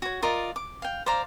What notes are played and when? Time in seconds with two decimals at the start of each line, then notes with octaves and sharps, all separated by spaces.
0.02 F#4 C#5
0.22 F4 A#4 D5 D#5
0.56 D6
0.82 F5 G5
1.06 C5 D5 F5 A#5